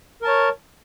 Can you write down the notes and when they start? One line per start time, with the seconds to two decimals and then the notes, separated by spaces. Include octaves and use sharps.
0.22 A#4
0.25 A5
0.27 C#5